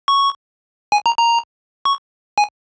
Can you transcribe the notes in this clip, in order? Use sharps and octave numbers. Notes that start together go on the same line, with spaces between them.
C#6
G#5
A#5
A#5
C#6
G#5